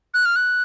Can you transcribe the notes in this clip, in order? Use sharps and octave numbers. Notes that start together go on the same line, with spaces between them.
F#6
F6
F#6